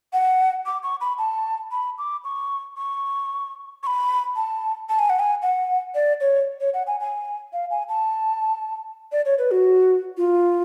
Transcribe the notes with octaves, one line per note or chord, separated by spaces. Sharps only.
F#5
D6
C#6
B5
A5
B5
D6
C#6
C#6
C#6
B5
A5
A5
G#5
F#5
G#5
F#5
D5
C#5
C#5
F#5
G#5
G#5
F5
G#5
A5
D5
C#5
B4
F#4
F4